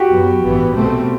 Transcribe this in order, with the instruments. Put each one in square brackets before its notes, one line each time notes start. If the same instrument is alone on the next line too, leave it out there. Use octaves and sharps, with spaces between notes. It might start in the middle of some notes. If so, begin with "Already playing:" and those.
Already playing: [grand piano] F#4 G4
[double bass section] F#2 F#3 B3
A1 G2 E3 B3
C2 B2 A3 C4